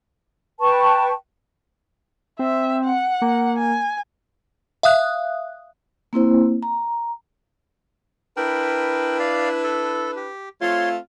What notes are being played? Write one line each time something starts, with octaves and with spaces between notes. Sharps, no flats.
B4 G5 A5 C#6
C4 E5
F#5
A#3
G#5
E5 F5 D#6 F#6
A#3 C4 E4 C5
A#5
D4 E4 A#4 B4 G5
D5 F5
A4
G4
A3 C4 F4 C#5 C6